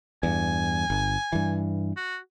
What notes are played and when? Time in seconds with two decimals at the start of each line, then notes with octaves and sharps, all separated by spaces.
0.23 E2 G2 G#5
0.90 G1
1.33 G2 E3
1.97 F#4